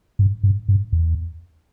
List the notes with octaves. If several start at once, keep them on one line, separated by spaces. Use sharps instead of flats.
G2
G2
G2
E2